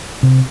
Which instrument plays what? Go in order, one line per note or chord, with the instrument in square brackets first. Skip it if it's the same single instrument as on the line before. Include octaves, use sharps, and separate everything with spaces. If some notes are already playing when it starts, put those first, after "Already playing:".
[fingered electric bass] C3